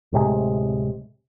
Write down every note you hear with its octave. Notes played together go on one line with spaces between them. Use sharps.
D1 A2 C3 G#3